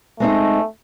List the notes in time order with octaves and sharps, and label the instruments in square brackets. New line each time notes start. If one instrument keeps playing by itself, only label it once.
[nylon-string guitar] G#3 C4 D#4 [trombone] A3